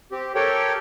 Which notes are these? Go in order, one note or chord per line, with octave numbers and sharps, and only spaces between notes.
C4 G4
G4 A4 A#4 C#5 G5